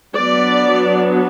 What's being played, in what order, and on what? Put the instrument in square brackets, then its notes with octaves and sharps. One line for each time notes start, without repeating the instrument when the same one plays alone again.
[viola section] F#3 B3 D4 D5